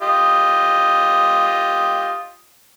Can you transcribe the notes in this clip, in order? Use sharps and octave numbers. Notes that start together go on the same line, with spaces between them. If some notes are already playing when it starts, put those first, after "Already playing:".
F4 G4 D#5